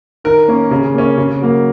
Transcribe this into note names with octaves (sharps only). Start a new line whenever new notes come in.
D#3 A#4
A#3 C#4
C#3
A#3 C#4
C#3
F#3 A#3